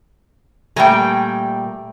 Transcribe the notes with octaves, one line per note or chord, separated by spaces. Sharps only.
A#2 G3 A3 G5 G#5 A#5